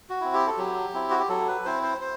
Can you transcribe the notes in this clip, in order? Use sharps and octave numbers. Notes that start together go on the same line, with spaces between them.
F#4
C4 E4
G4
A4
F#3 G4
C4 E4
F#4
G4
F#3 A4
B4
C4 E4 C5
C5
C5